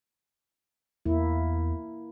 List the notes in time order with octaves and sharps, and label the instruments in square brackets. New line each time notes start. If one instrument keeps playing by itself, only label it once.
[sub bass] E2 [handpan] A#3 E4